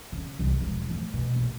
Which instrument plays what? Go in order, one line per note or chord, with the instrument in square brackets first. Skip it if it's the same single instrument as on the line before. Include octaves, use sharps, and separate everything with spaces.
[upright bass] C#3
C2
E1 F3
A2 F3
B2
A#1